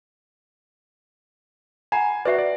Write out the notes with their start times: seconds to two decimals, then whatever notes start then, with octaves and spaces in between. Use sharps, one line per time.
1.92 F#5 G#5 A#5 B5
2.25 F#4 B4 D5 E5 F#5
2.39 D5